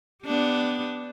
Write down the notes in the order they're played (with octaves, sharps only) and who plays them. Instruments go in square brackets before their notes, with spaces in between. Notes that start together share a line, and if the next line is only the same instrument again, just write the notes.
[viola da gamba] B3 D4 G4